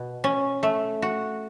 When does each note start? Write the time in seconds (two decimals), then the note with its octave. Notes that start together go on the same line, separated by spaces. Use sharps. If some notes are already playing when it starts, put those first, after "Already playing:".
Already playing: B2
0.24 C#4
0.63 A3
1.02 F#4